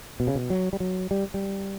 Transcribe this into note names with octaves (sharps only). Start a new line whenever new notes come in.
B2
C#3
B2
F#3
G3
F#3
G3
G3